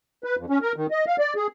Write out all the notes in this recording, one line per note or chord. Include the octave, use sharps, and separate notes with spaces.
B4
F2
C#4
A#4
D#3
D#5
F5
D5
G#4